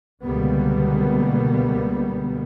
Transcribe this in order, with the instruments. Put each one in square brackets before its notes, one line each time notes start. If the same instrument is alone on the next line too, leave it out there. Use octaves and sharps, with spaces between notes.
[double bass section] C#2 B2 D3 G3 A#3 B3